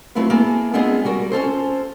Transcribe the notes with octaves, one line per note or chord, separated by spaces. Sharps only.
F#3 A3 C4 E4 F4 B4
A#3 B3 E4 G#4 A4
G#3 B3 C4 D4 F4 G#4
G3 F#4 A#4
C#4 F4 A4 C5